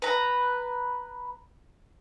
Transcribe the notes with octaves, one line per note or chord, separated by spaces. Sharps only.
B4 A#5